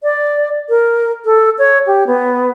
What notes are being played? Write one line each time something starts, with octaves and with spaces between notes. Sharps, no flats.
D5
A#4
A4
C#5
G4
B3